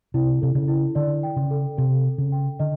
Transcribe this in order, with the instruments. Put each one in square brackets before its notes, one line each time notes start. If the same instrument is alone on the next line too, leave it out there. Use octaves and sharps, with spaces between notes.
[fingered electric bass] C3 [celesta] E4
[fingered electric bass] C3 [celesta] A4
[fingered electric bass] C#3
[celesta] E4
[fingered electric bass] D3 [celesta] D5
[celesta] G5
[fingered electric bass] C#3
[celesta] A4
[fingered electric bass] C3 [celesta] A4
[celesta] A4
[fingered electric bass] C#3
[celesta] G5
[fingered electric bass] D3 [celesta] D#5